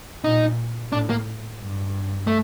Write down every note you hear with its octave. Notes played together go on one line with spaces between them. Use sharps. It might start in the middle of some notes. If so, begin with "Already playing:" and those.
A#2 D#4
A2 D4
A#3
G2
A3